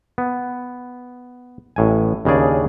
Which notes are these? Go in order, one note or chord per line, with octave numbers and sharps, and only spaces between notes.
B3
A1 A2 G#5
D#2 C#3 D4 G#4 D5